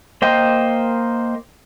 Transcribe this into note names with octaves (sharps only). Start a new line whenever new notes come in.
A#3 C5 D#5 G5